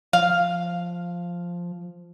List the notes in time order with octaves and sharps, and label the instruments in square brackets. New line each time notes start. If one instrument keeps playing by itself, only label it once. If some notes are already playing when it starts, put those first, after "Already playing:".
[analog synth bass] F3 [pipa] F5